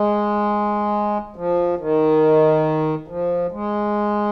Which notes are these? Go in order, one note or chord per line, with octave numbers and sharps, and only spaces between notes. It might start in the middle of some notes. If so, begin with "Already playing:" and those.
Already playing: G#3
F3
D#3
F3
G#3